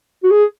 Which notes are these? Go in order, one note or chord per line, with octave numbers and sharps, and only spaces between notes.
F#4
G#4